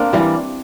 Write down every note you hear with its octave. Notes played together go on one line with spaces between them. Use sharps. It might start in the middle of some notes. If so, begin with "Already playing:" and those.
Already playing: A#3 C4 D4
E3 G3